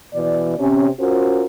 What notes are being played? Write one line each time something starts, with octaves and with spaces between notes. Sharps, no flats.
B2 E3 D5
C3 C#4
C#4 F4 F#4 A#4 C5